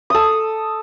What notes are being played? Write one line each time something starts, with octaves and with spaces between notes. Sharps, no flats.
A4 D#6